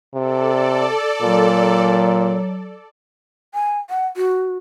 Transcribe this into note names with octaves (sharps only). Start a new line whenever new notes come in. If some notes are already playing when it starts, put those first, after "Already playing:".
C3 A4 D5
A#2 F#3
G#5
F#5
F#4